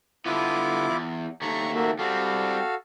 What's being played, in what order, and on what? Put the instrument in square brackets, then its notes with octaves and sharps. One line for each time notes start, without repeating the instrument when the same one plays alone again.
[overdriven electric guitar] D3 B3 [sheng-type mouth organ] E4 F4 D6
[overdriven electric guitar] E2
[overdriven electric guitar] D#2 A3 [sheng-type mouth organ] A#5 C#6
[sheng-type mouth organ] A#3 F#4 E5
[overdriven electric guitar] G3 C4 [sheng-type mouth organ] F#4 A4 F5